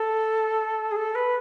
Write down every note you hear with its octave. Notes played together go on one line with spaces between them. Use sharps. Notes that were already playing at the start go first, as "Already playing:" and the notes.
Already playing: A4
G#4
A4
B4